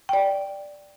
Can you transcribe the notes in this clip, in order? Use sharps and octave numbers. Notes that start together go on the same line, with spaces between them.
D5 G5